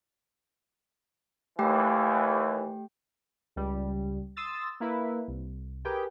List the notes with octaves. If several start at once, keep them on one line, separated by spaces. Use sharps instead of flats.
D#2 E3 A3 G4 G5
C#2 G3
C6 D#6 E6 A6
A#3 E4 B4
C2
G4 G#4 A#4 B4 G5